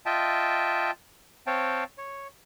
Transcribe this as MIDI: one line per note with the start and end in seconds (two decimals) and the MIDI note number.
0.06 0.91 65
0.06 0.91 75
0.06 0.91 76
0.06 0.91 79
0.06 0.91 81
1.47 1.84 60
1.47 1.84 73
1.47 1.84 77
1.47 1.84 79
1.47 1.84 81
1.98 2.28 73